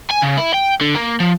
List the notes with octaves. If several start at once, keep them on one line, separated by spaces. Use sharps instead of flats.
G#5
C#3
E4
G5
D3
A#3
F3